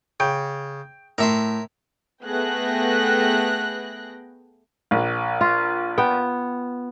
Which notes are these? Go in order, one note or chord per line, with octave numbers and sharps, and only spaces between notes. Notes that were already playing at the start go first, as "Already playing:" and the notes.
C#3 G5
A2 A#4 E5 C6
A3 B3 G#4 G5 F#6 A#6
A#1
F4
B3 G5